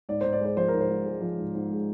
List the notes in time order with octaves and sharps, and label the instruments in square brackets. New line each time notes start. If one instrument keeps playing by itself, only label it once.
[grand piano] G#2 D5
G#2 C5
D5
G#3 C5
F3 C5
G#2 A#4
C5
G#2
G#3
F3
G#2
G#2
G#3